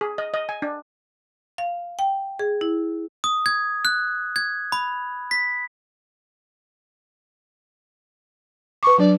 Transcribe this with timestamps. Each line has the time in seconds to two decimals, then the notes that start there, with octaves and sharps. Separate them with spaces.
0.01 G#4
0.18 D#5
0.34 D#5
0.49 G#5
0.62 D4
1.58 F5
1.99 G5
2.39 G#4
2.61 E4
3.24 D#6
3.46 G#6
3.85 F#6
4.36 G#6
4.72 B5
5.31 B6
8.83 B4 C#6 D6
8.98 F#3 D4 D5